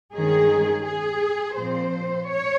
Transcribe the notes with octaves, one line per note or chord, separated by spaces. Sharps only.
G2 D#3 G#3 C#4 G#4
G#4
A#2 F3 C4 C5
C#5